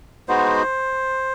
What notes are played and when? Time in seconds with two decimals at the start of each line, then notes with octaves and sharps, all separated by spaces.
0.28 G#3 B3 D#4 F#4 C5